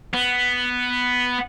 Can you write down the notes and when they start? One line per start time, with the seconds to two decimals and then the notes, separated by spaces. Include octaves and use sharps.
0.14 B3